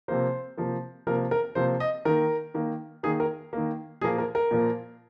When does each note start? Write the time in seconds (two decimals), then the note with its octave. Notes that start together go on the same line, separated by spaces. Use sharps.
0.08 C3 F3 A#3 C5
0.58 C3 F3 A#3
1.07 C3 F3 A#3 A#4
1.31 A#4
1.55 C3 F3 A#3 C5
1.80 D#5
2.05 D#3 A#3 A#4
2.54 D#3 A#3
3.03 D#3 A#3 G#4
3.20 A#4
3.53 D#3 A#3
4.01 A#2 F3 A#3 G#4
4.18 A#4
4.35 A#4
4.51 A#2 F3 A#3